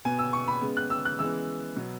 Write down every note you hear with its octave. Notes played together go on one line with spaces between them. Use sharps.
B2 B3 G#5
E6
C#6
B5
C#3 G#3 B3
F#6
E6
F#6
C#3 E3 G#3 B3 E6
B2 F#3 B3